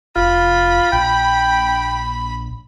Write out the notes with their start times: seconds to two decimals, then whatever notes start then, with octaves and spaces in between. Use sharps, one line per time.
0.16 F1 F4 B5
0.92 A#1 G5